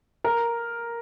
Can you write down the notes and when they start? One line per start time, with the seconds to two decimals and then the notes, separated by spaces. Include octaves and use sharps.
0.24 A#4